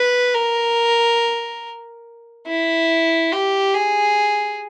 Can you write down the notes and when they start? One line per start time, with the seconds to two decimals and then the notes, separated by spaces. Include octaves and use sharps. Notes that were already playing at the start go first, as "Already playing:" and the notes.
Already playing: B4
0.35 A#4
2.47 E4
3.32 G4
3.75 G#4